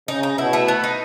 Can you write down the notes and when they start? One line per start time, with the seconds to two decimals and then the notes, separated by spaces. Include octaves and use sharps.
0.08 C#3 D#4
0.23 D#4
0.38 B2 E4
0.53 A3
0.68 B3
0.84 D#4